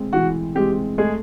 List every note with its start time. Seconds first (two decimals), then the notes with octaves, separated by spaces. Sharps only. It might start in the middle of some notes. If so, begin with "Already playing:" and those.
Already playing: G#3 C4
0.13 E3 F#4
0.55 G#3 C4 G4
0.98 G#3 A3 G#4